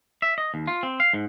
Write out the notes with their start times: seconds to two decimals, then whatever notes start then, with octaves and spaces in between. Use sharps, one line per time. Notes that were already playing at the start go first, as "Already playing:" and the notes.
0.22 E5
0.38 D#5
0.54 D#2
0.67 F4
0.83 C4
1.00 F5
1.13 G#2